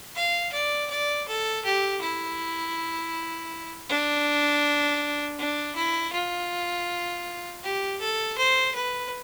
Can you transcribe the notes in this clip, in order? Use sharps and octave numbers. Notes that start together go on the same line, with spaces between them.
F5
D5
D5
A4
G4
E4
D4
D4
E4
F4
G4
A4
C5
B4